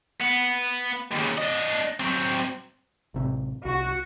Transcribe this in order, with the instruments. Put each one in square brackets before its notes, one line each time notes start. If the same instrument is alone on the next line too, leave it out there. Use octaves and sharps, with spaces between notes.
[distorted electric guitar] B3
D#2 C#3
D4 D#5
F#3 C4
[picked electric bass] A1 C3
[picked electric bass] C2 [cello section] F#4